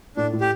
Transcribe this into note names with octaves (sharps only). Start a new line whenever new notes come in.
A2 D4
A2
G4